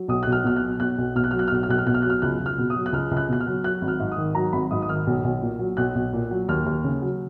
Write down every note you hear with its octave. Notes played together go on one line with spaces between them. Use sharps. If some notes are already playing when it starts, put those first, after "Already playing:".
Already playing: F#3
B1 D#6
B1 F#6
F6
B2 F6
F#6
F#3
B1 F#6
B1
B2 F6
F#6
F#3 F6
F#6
F6
B1 F#6
F6
B1 F#6
F6
B2 F#6
F6
F#3 F#6
F6
C#2 F#6
C#2
F6
B2
D#6
F#3
F#6
C#2 F6
C#2
F#6
B2 F#6
F6
F#3
F#3 F#6
G#1
F6
G#2
D#6
D#3
F#3 A#5
G#1 B5
G#2 D#6
D#6
D#3 F6
B1
B1
A#2
F#3
B1 F#6
B1
A#2
F#3
D#2 F6
D#2
C#3
F#3